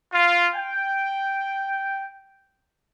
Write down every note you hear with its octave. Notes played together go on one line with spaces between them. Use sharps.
F4
G5